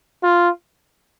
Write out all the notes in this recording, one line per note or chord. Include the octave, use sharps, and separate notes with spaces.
F4